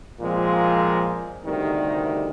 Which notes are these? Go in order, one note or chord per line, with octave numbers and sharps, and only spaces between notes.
A#2 F3 G#3 C4
D2 C3 D#3 G3